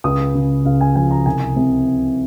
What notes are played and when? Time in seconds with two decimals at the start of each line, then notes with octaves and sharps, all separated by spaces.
0.04 C#2 D#6
0.34 C#3
0.65 C#2 F5
0.81 G#5
0.95 F3 G#5
1.11 A#5
1.26 C2 G#5
1.56 C3